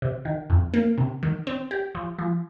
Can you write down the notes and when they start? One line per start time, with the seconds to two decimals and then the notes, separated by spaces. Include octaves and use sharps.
0.02 C3
0.25 D#3
0.50 F2
0.74 A#3
0.98 C3
1.23 D#3
1.47 C4
1.71 G4
1.95 F3
2.19 F3